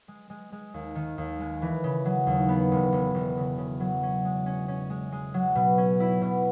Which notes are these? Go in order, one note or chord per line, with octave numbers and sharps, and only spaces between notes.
G#3
G#3
G#3
D#2
D#3
D#2
G#3
E3
C#3
F#3
D#2
B3
E1
E1
E1
C#3
C#3
F#3
C#4
G#3
C#4
C#4
G#3
G#3
F#3
B2
C#4
E4
B2